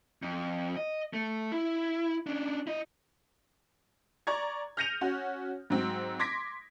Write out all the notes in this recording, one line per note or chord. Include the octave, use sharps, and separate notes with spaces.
F2
D#5
A3
E4
C#4 D4
E4 D#5
D5 A#5 C#6 G#6
F6 G6 A#6 C#7 D#7 F7
C#4 F#4
G#2 F#3 C4
C6 D6 G#6 A#6 B6 D7